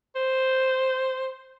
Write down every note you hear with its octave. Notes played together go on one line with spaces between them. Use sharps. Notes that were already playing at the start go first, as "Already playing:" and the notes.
C5